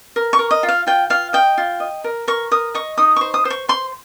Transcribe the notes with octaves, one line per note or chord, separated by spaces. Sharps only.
A#4
C#6
A#4
D#5
F4
F5
F4 G5
F4 F5
D#5 G5
F4
D#5
A#4
A#4 C#6
A#4 D#6
D#5 C#6
D#4 D#6
C5 C#6
D#6
C5
C#6
C5 C6